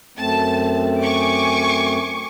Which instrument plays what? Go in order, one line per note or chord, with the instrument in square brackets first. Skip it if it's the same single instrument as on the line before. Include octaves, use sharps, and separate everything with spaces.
[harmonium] F#2 A3 C4 [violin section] A5
[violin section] G#5 C#6 D6